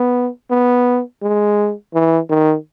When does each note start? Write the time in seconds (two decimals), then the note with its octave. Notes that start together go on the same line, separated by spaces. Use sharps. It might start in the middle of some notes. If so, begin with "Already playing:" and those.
Already playing: B3
0.50 B3
1.23 G#3
1.94 E3
2.29 D#3